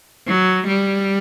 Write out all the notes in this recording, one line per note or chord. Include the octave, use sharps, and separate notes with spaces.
F#3
G3